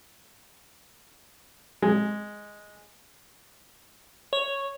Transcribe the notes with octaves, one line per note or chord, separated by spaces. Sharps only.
G#3
C#5